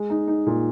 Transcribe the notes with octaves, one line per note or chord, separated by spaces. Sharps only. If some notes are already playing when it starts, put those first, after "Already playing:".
Already playing: G#3
D#4
D#4
A#2